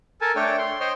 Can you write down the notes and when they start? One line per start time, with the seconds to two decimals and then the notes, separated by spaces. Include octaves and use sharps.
0.21 A4 A#4 G#5 A5
0.36 A3 D4 C#5 G5
0.59 C6
0.80 C5 C#5 D#5 G5 C6